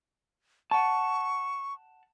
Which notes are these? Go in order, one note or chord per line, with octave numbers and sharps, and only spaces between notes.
F#5 A5 C#6